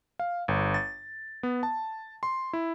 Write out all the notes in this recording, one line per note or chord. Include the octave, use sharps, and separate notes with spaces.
F5
G1
A6
B3
A5
C6
E4